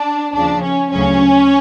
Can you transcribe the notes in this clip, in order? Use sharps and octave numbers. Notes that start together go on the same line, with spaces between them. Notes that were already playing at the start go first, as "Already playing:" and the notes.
Already playing: D4
D#2 C#3 F3 D4
C#4
D2 C#3 F#3 C#4